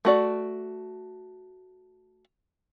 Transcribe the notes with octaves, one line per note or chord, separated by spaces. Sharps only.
A3 F#4 D5